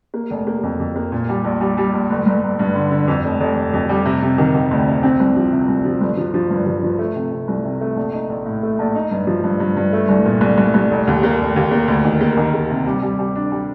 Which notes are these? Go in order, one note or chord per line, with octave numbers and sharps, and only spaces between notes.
A#3
F1
A#3
F2
F2
A#3
A#2
G3
A#1
G3
G3
A#1
G1
G1
G1
G2
D3
D3
F2
F1
F1
F1
F2
G3
C3
C3
D#3
D#3
D2
C3
C4
C2
F3
C3
C2
F3
G1
F3
F3
G2
F3
F3
A3
C3
C3
C2
C3
A3
A#1
D#4
A#1
A2
A3
A#1
D#4
G2
F3
G2
G2
G2
A3
C2
A#2
C2
C2
C2
F1
D#2
A#3
F1
D#2
A#3
D2
D#3
A#3
D#3
A#3
C3
G3
G3
G3
D4
G3